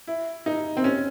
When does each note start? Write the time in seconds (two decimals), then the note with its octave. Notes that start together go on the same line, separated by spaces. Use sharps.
0.07 E4
0.46 D#4
0.77 C4
0.84 C#4